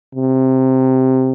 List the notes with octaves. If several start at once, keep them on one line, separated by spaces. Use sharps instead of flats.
C3